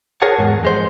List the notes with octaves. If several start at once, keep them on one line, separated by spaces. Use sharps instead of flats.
G#4 A#4 C#5 F#5 A5
E2 G#2
F2 G#3 C5